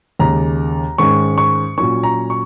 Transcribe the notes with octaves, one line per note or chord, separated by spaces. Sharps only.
D#2 C#3 G#3 A#5
G#2 D#3 G#3 C#4 C#6
C#6
A#2 F#3 C#4 C#6
A#5
C#6